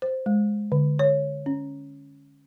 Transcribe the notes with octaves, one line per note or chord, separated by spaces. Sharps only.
C5
G#3
D3
C#5
C#4